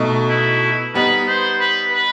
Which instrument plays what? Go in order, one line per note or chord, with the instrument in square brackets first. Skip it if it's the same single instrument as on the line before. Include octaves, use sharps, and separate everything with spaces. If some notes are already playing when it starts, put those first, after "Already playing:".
Already playing: [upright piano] B2 A3 D#4
[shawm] E4
[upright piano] G3 B3 D#4 [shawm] B4
[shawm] C5
B4
B4